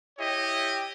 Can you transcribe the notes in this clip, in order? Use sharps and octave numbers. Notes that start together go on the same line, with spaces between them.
E4 G4 C#5 D#5